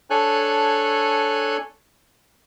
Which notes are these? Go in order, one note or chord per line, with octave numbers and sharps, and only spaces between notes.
D4 A4 C#5 G#5 F#6